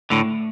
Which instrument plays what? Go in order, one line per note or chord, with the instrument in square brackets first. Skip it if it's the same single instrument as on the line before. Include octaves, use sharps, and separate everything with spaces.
[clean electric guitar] A2 D3 [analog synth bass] A3